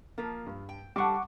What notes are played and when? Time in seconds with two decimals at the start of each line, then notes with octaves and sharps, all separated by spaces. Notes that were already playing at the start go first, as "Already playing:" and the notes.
0.18 F3 A#3 F4
0.46 G2
0.69 G5
0.96 G3 D4 A4 F#5 C#6 D6